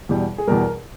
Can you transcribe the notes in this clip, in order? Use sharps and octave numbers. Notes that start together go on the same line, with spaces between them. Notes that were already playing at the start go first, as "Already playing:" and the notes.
E2 B2 G3
G#4
E2 B2 G3 A#4